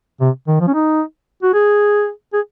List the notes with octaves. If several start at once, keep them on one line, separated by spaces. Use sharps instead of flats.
C3
D#3
F3
C#4
D#4
F#4
G#4
G#4